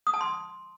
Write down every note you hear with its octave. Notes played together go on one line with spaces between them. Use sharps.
D#6
A5
C6